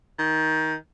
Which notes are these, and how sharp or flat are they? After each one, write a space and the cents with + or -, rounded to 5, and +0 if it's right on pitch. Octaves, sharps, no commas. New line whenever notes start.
D#3 +15